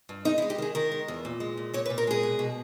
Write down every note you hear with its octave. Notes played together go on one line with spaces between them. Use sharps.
G2
G#3 D#4
E4
G#3
G4
D#3 G#4
D#3 A#4
G#3
E2
A#2
G#3
A#2
A#2 C#5
B4
A#2
A#4
G#3 G#4
B2
B2